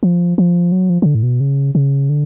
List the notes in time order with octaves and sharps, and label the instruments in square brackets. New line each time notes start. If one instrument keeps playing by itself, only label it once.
[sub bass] F3
F3
F#3
F3
F3
D3
A2
B2
C#3
C#3
D3